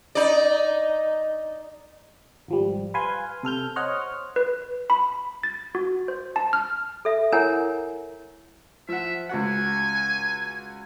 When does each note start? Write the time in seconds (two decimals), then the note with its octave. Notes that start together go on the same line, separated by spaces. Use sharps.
0.15 D#4 D5
2.48 G#1 F3 G3
2.94 B4 F5 G#5 C6
3.43 C3 A4 F6 G6
3.76 C5 C#5 D#5 F#5 F6
4.36 B4
4.90 B5
5.43 A6
5.75 F#4
6.08 C5
6.36 A5
6.53 F6
7.05 A4 E5
7.32 E4 A#4 C#5 F#5 G#5 A#5
8.88 F3 E5 F#5
9.29 C#2 F#4 F#5 G#5